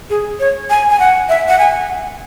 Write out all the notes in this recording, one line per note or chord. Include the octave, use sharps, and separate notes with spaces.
G#4
C#5
G#5
G#5
F#5
E5
F#5
G#5